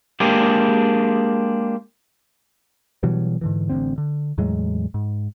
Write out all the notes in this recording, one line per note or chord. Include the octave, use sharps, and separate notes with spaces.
G#3 A#3 D4 G4 G#4
B2 E3 F#3 G3
G#2 D3 E3
A1 B2 D3 C4
D3
E2 A2 F#3 G#3
G#2